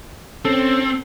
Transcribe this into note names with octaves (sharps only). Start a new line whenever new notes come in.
C4 C#4 A4